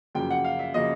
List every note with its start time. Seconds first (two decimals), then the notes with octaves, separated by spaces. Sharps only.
0.15 F#2 C#3 F3 A#3 G5
0.30 F#5
0.44 F5
0.59 E5
0.74 C#3 F3 A#3 D#5